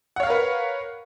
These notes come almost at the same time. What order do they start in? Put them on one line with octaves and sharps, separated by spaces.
F#5 C#5 F5 A#4 B4